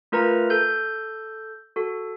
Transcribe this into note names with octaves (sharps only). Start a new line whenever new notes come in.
A3 F4 A#4 B4 A#5
A4 G6
F#4 A4